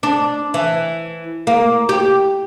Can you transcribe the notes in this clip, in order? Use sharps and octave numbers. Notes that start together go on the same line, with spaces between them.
D4
E3
A#3
G4